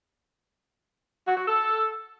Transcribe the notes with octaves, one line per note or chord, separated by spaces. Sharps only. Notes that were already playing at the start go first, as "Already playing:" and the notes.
F#4
F#4
A4